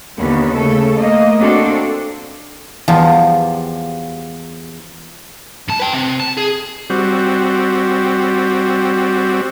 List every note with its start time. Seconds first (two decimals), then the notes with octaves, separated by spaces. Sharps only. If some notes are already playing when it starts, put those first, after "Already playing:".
0.18 D#2 D3 B3 C#4
0.55 C#3 A3 A4
0.97 A3 A#3 D#5
1.38 A#3 C4 D4 F#4 A4
2.88 E2 F3 G3
5.68 G2 A5
5.80 B4 G5
5.94 C3
6.20 A5
6.38 G#4
6.90 G3 C4 F#4